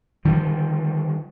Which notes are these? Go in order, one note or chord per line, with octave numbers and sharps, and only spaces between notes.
D3 D#3 F3 G3